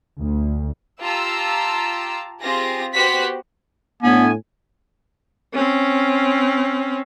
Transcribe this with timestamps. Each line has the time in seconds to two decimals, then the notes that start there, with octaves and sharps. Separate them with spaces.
0.21 D2
1.00 F4 G4 A5 A#5 E6
2.40 C4 F4 G4 G#4 A#6
2.93 B3 F#4 G4 C5 F#5 B6
4.03 A2 B3 D4 G#5
5.53 C4 C#4